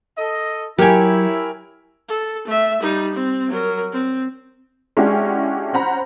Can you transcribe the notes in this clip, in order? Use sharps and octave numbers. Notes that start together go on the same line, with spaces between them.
A4 D#5
F#3 E4 G4 A#4 C#5 G#5
A4
A3 E5
G3 D#4
C4
F#3 A#4
C4
G#3 C#4 D4 E4 F#4 G4
C#4 C5 F#5 A#5 B5